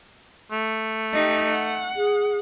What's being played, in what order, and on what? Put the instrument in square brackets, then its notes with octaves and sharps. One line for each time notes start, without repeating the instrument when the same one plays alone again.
[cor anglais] A3
[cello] D#4 G4
F#5
[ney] G#4